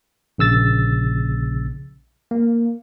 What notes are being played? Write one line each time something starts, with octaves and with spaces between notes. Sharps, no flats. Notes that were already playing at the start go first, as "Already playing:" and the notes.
A#1 C#3 E6 A6
A#3